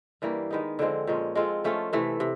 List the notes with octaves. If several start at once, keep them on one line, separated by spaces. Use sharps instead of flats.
G2 E3 G3 A#3
D#3 G#3 B3 D#4
D3 F3 G#3 C4
A#2 F3 G#3 C#4
G#3 C4 F4 A4
F3 A3 C#4 F4
C3 E3 A3
C3